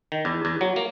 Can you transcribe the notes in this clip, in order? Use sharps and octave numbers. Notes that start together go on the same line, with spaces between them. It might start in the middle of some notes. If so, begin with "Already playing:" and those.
D#3
E2
E2
F#3
A#3